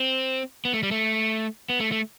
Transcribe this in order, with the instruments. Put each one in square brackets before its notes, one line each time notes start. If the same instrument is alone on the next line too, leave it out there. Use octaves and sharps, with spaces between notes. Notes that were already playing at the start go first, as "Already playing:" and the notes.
Already playing: [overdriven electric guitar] C4
B3
A3
G3
A3
B3
A3
A3